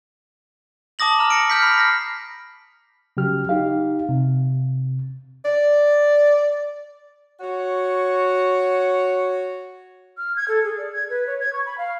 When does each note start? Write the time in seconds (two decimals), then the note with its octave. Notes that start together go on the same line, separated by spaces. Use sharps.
0.99 A5 D6 D#6 A#6 F#7
1.19 A#5 F6
1.30 A#6 C#7 D7
1.50 F6 G6 B6
1.62 B5 F6 C7
1.78 F6 A#6 B6
3.17 C#3 F#3 G4 F6
3.49 D#4 G4 F5
4.09 C3
5.45 D5
7.40 F#4 C#5
10.17 F6
10.36 G#6
10.48 A4
10.64 G#4
10.78 D5
10.93 G#6
11.10 B4
11.27 C#5
11.40 G#6
11.53 C#6
11.66 B5
11.78 F5